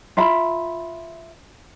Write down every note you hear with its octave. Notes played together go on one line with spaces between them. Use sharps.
F4 E5 A#5 B5